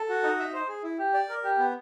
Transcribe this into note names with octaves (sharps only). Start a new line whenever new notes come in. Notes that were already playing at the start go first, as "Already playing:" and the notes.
Already playing: A4
F#4
D#4
E5
C5
G#4
E4
G4
D5
A#4
G4
B3